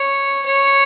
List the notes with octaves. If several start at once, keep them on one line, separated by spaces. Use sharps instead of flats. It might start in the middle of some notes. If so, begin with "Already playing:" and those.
Already playing: C#5
C#5